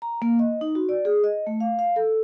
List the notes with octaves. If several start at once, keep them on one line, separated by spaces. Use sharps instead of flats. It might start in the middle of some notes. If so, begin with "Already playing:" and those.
A#5
A#3
D#5
D#4
F#4
D5
G#4
D#5
A3
F5
F5
A4